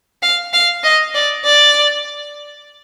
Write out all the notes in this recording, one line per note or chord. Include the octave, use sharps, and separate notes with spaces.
F5
F5
D#5
D5
D5